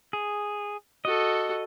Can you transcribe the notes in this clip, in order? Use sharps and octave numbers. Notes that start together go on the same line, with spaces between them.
G#4
F#4 A4 D#5